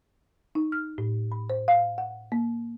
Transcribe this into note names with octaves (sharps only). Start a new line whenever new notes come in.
D#4
F6
A2
B5
C5
F5
F#5
A#3